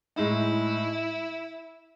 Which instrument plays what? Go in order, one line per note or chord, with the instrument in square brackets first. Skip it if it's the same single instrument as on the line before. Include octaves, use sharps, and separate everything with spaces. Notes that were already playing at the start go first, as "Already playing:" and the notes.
[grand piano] A2 G#3 D#4 [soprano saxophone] E4